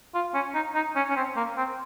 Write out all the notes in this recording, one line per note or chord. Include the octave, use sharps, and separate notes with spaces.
F4
C#4
D#4
D#4
C#4
C#4
C4
A#3
C4